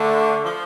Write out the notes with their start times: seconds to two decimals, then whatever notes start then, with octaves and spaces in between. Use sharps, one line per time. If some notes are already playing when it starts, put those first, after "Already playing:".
Already playing: D3 A3
0.45 F3